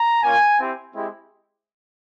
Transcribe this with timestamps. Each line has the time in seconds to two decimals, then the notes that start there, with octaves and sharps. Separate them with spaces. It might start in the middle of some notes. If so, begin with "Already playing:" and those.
Already playing: A#5
0.21 A#3 C#4 F4 G#5
0.57 C4 E4 G4
0.93 G#3 C4 E4 G4